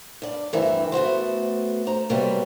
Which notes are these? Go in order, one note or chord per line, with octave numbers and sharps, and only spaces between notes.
G2 D5
D2 G2 E3 C4 A#4 E5
A3 B3 F#4 C5
C5 A#5
C3 F#3 G3 A#3 B3